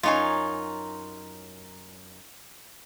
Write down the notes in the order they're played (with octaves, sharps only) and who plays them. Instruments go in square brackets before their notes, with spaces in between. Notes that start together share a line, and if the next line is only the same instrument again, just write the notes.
[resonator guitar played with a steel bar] F#2 D#4 G#5 [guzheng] F4 C#5 F5